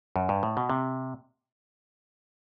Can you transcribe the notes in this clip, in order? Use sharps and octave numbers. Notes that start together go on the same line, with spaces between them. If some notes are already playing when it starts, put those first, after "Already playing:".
F#2
G2
A2
B2
C3